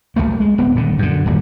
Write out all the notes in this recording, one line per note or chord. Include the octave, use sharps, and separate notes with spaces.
B1 F2 A3 A#3
G#3
D1 B3 C4
D#1 A#2 D3
F#2 D3
D1 D#2 G3